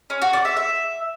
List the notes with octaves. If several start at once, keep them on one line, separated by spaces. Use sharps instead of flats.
C#4
F#4
D5
E5
E5